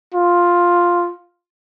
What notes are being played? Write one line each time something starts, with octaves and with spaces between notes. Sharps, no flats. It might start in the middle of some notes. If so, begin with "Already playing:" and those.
F4